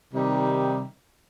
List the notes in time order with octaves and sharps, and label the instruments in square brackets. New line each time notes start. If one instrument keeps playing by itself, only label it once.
[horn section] C3 D#3 G3 D#4 G4